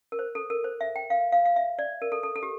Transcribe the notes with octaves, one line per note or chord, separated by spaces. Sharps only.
A#4
C5
A4
A#4
C5
E5
G5
F5
F5
F5
E5
D5
A#4
A4
A4
A4
G4